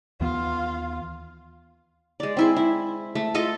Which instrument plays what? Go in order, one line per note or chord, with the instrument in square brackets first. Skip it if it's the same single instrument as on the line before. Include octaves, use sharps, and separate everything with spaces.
[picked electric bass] D#2 E3 B3 [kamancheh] F4 F5
[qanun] G#3 D5
C4 E4 G#4
E4
A3
F4 A4 D#5